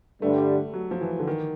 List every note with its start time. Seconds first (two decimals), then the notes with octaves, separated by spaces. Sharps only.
0.21 G2 D3 G3 A3
0.74 F#3
0.91 F3
1.01 E3
1.20 D3
1.27 D#3